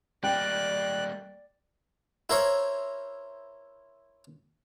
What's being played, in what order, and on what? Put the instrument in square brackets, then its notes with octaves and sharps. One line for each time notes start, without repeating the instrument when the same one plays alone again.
[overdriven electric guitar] G3 A#3 [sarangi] D5 [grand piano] G5 [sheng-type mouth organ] F#6
[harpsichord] E4 A#4 C5 C#5